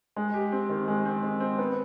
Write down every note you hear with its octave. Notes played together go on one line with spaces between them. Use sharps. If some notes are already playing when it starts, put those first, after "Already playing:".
G#3
G4
C4
D#3
G#3
C4
G#3
C4
B3